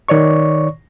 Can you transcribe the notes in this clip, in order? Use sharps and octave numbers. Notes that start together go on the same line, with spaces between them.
D#3 C#5 D5 C#6